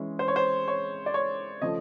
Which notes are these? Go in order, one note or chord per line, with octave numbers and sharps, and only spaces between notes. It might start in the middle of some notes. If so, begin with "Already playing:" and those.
Already playing: E3 G#3 C#4 E4
C5
C#5
C5
C#5
D5
C#5
C#3 F3 A3 D#5